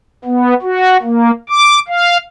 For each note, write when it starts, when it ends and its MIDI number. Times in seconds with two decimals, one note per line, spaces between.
0.25 0.54 59
0.62 0.97 66
1.02 1.31 58
1.49 1.79 86
1.88 2.17 77